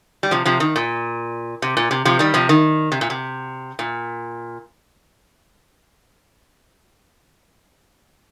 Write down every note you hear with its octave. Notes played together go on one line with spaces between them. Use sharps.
G3
C3 F3
C3 F3
D#3
A#2
C3
A#2
C3
C3 F3
D#3 G3
C3 F3
D#3
C3
A#2
C3
A#2